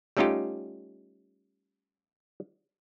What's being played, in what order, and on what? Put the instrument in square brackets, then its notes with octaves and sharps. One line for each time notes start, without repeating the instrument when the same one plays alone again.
[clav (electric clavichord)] G3 A3 C#4 D#4 F4 G4